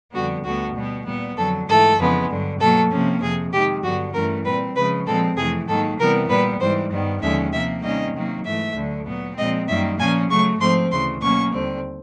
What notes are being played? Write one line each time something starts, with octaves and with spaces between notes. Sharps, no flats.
F2 D3 G3 B3 F#4
D2 D3 G3 B3 F#4
B2 G3 B3
A#2 G3 B3
F2 D3 F#3 A4
G#2 E3 A3 A4
F2 C#3 E3 G#3 B3
G2 D3 F#3
B2 F#3 A#3 A4
C3 F3 A#3 C#4
F2 C3 F3 G#4
C3 D#3 G#3 G4
G2 D3 F#3 B3 F#4
G2 E3 A3 C#4 A#4
A#2 G3 C4 B4
C#3 F3 G#3 B4
A#2 F3 G#3 C4 A4
F2 C3 E3 A3 G#4
G#2 D#3 F#3 A#3 A4
C3 E3 G3 B3 A#4
A#2 G3 B3 B4
G#2 E3 G3 C5
G2 D#3 G3 B3
D#2 D3 F3 G#3 C#4 E5
C3 F3 A#3 E5
C3 D#3 G3 A#3 C#4 D#5
C3 D#3 F#3 A#3
G#2 E3 A3 E5
D2 D3 F#3
A#2 F#3 B3
A#2 F3 G#3 C4 D#5
F#2 D#3 G3 A#3 E5
A#2 F3 A#3 C#4 G#5
C#3 F#3 A3 C#6
G#2 F3 A3 C4 C6
D2 C#3 E3 C6
B2 F#3 A#3 C#4 C#6
D#2 D3 G3 C4